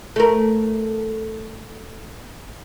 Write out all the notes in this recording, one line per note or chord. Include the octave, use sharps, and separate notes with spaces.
A3 A#4